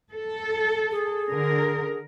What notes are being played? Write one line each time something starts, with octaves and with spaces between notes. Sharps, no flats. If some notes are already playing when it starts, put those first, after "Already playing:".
A4
G#4
D3 A#4